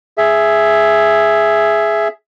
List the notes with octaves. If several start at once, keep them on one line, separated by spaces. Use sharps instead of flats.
G#4 E5